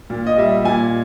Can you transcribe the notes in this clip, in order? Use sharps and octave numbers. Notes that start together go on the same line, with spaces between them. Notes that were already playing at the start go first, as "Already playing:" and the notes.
A#2
D#5
G3 E5
A#2 G#5